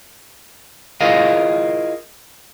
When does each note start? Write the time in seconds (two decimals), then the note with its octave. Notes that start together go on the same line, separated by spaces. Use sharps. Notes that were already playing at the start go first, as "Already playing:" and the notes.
1.01 E4 F4 G#4 A#4 D#5 F5